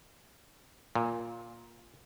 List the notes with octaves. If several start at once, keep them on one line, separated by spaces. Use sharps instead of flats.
A#2